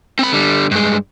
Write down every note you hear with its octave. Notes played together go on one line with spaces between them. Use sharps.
C4 B5
D3 G3
G2 G#3